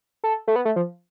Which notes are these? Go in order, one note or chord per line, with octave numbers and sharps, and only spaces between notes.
A4
A3
B3
A3
F3